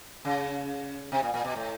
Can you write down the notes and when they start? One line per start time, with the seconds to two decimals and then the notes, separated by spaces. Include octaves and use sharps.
0.25 C#3
1.12 C3
1.23 A#2
1.34 A#2
1.44 B2
1.56 A2